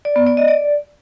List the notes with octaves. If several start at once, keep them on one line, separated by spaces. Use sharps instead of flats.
D5
B3
D5
D#5
D5